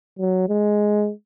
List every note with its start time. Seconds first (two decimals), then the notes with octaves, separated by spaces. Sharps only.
0.19 F#3
0.49 G#3